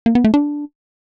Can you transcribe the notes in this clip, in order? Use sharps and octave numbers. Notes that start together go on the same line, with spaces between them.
A#3
B3
A3
D4